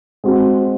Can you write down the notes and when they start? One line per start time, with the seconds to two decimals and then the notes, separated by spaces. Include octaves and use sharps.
0.24 G#3 C4 F#4